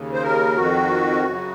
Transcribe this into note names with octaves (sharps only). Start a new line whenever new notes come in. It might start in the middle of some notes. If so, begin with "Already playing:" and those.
Already playing: D#2 C#3
C5
A#4
F2 D#3 F#4
F#2 C#3